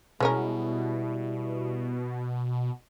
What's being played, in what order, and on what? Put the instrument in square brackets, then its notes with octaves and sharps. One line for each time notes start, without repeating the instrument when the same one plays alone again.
[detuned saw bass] B2 [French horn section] G3 E4 [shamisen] G#3 C#4 A#4